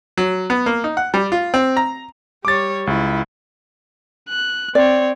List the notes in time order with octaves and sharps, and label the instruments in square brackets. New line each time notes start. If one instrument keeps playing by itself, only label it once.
[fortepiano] F#3
B3
A#3
D#4
F#5
G3
F4
C4
A#5
[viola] G3 C#5 [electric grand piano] D6 A6
[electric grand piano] C#2 [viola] E4
[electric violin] F#6
[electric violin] C4 C#5 [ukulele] D5